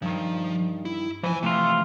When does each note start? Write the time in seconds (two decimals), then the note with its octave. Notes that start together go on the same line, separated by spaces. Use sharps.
0.02 G2 D#3 F3
0.85 E4
1.23 E2 E3 F3 G#5
1.43 C3 E3 A3 F4